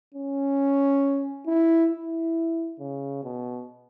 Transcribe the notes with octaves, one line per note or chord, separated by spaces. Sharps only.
C#4
E4
E4
C#3
B2